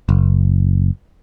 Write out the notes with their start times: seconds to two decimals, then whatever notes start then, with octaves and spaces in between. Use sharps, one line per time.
0.09 F#1